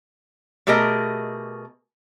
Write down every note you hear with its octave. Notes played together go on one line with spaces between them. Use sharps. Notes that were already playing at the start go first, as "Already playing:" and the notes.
B2 A3 G4 G#4 A#4 D#5